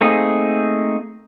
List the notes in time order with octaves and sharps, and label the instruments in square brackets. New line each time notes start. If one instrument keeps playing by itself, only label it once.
[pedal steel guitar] A3 A#3 C4 D#4 G#4